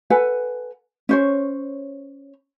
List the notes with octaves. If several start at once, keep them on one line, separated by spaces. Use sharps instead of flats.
A4 B4 F#5 G#5
C#4 C5 C#5